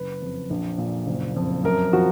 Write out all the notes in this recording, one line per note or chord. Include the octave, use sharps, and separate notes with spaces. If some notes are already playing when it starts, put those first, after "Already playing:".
Already playing: F#1 B4
F2
A#1
A#2
F#1
F2
F#2 A#4
F3 F#4